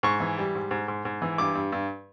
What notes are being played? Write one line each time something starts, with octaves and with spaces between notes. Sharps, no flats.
G#2 C#6
E3
G3
G#2
G#2
G#2
G#2
E3
G2 D6
G2
G2